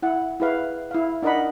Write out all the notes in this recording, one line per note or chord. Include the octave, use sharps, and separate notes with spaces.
E4 F#5
E4 G#4 B4 F5
E4 F5
D4 D#4 A#4 D#5 F#5 B5